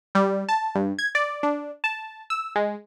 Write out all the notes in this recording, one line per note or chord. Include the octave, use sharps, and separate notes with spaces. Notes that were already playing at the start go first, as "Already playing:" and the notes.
G3
A5
G2
G#6
D5
D4
A5
E6
G#3